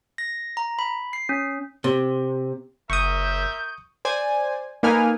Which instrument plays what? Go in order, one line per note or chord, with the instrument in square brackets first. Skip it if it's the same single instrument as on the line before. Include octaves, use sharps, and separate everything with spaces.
[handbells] A#6
A#5
B5
C7
C#4
[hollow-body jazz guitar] C3
[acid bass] F#1 [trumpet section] A#4 E5 [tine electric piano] C#6 D#6 [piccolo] G6
[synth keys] C5 D5 G#5
A#3 D#4 A4 B4 G#5 F6